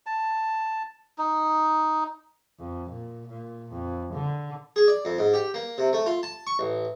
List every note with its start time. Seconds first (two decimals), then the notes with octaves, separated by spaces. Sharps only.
0.06 A5
1.18 D#4
2.59 F2
2.91 A#2
3.28 A#2
3.72 F2
4.14 D3
4.76 G#4
4.88 D5
5.05 F2
5.19 G#2
5.34 G4
5.54 A#3
5.78 C3
5.93 A3
6.06 F4
6.23 A5
6.47 C#6
6.59 A1